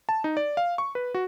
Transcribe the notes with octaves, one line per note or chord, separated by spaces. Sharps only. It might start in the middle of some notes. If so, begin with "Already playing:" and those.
A5
D#4
D5
F5
C#6
B4
F#4